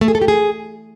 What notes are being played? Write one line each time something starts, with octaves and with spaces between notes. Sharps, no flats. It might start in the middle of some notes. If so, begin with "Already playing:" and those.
A3
G#4
A4
G4
G#4